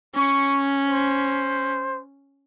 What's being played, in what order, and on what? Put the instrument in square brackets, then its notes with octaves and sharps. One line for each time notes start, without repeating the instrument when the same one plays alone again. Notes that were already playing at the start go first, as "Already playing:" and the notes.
[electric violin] C#4 [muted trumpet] C#6
[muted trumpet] C5